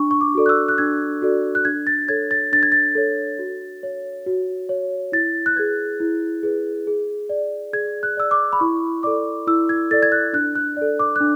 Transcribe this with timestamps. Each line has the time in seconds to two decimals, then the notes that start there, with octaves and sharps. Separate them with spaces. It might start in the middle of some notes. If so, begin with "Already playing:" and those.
Already playing: D4 C#6
0.11 C#6
0.21 D6
0.35 F#4 A4 D5
0.46 F#6
0.49 E6
0.68 F#6
0.78 D4 G#6
1.22 F#4 A4 D5
1.55 F#6
1.65 D4 G#6
1.87 A6
2.08 A4 C#5 G#6
2.31 A6
2.52 D4 A6
2.63 G#6
2.72 A6
2.95 A4 C#5
3.39 F#4
3.83 C#5
4.26 F#4
4.69 C#5
5.12 E4 A6
5.46 F#6
5.56 G#4 B4 G#6
6.00 E4
6.43 G#4 B4
6.87 G#4
7.29 D5
7.73 G#4 G#6
8.03 F#6
8.17 D5 E6
8.31 D6
8.53 B5
8.60 E4 C#6
9.03 A4 D5 D6
9.47 E4 E6
9.69 G#6
9.91 A4 D5 A6
10.03 G#6
10.12 F#6
10.33 D4 F#6
10.55 F#6
10.77 A4 D5
10.99 D6
11.16 F#6
11.20 D4